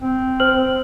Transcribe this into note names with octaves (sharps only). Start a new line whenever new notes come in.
C4
C5 F6 F#7